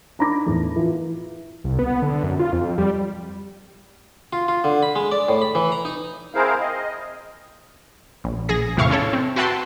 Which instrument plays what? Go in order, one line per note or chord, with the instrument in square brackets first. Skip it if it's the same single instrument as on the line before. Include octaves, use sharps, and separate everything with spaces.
[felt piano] D4 D#4 A#5 B5 D6 A#6
E2 A2
E3 F4
[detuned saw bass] C2
B3
D3
F#2
F4
F2
G3
[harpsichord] F4
F4
D3
B5
G#3
D5
A2
B5
E3
A#5
D#4
[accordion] C4 E4 G#4 A#4 C5 F5
D#5
[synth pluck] A#1
A#1 G#4 A#6
E2 A2 C3 E4 F5 C#6
C#4 E4 A4 C#5
C4
F#4 B4 E5 G5 A5 C6